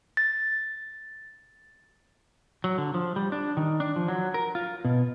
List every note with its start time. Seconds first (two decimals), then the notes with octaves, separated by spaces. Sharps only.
0.17 A6
2.64 F#3
2.78 D3
2.94 F3
3.16 G3
3.32 D4
3.57 D#3
3.80 D4
3.96 F3
4.08 F#3
4.34 A#4
4.55 F4
4.85 B2